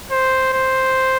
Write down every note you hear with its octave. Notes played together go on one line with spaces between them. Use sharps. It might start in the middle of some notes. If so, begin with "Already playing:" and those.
C5
C5